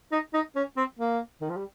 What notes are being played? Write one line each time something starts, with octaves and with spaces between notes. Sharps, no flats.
D#4
D#4
C#4
C4
A#3
D#3
F3
G3